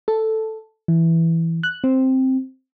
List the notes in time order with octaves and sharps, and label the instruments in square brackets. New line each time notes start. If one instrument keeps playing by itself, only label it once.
[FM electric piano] A4
E3
F#6
C4